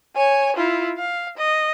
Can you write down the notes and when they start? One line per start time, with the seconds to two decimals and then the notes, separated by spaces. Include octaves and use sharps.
0.16 C#5 G#5
0.57 E4 F4
0.97 F5
1.37 D#5